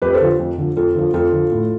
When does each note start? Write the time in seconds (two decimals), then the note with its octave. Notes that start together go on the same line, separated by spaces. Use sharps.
0.02 F2 G4 B4
0.14 A4 C5
0.21 D3 F3
0.39 F2
0.58 D3 F3
0.76 F2 F4 A4
0.95 D3 F3
1.14 F2 F4 A4
1.32 D3 F3
1.51 A2